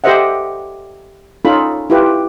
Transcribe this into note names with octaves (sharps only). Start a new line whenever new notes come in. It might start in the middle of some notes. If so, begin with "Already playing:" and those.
G4 A4 C5 D#5 E5 F#5
C#4 D#4 F4 A4 B5
E4 F4 G4 B4